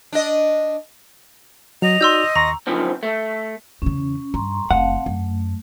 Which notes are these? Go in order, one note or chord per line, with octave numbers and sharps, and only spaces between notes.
D4 D#5
F#3 D#5 F7
D#4 F#4 D5 C6 E6 G6
D#2 A#5 C6 C#6 A#6
F#2 D3 D#3 F3 B3 C4
A3
E2 C#3 C#4
G2 A#5 C6 C#6
F#1 A3 C4 F5 F#5 A5
F#2 A3